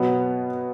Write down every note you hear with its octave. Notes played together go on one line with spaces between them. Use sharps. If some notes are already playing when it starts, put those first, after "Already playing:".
Already playing: B2 F#3 B3